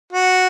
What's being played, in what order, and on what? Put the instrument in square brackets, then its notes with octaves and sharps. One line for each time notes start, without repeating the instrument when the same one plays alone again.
[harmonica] F#4